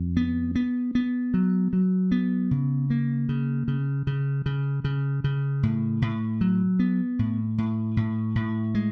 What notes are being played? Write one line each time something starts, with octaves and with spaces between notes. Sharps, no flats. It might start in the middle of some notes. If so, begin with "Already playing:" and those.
Already playing: F2
B3
B3
B3
F#3
F#3
B3
C#3
A#3
C#3
C#3
C#3
C#3
C#3
C#3
A2
A2
F#3
B3
A2
A2
A2
A2
G#3